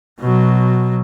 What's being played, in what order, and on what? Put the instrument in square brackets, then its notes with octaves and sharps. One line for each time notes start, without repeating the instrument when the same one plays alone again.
[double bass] B2 F#3